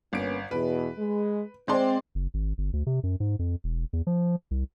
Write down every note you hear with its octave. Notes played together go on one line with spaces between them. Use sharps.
G1 A#3 B3 C#4 D7
E2 B2 B4
G#3
G#3 C4 D5 C6
F#1
G#1
G1
D2
C3
F#2
G#2
F2
E1
E2
F3
C2